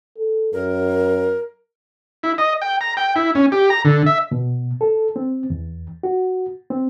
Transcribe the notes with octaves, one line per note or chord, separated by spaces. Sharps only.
A4
F#2 A#4
E4
D#5
G5
A#5
G5
E4
C#4
G4
A#5
D3
E5
B2
A4
C4
E2
F#4
C4